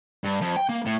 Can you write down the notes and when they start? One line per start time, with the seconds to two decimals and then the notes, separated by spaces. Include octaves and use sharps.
0.24 G2
0.42 F2
0.56 G5
0.69 A#3
0.86 A2